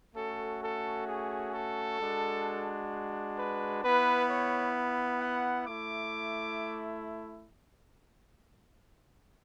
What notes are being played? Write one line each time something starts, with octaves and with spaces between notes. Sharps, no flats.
A3 C#4 F#4 A4
A4
G#4
A4
G#3 D4 F#4
B4
B3 E4 B4
C#5
F#5
A3 E4 D6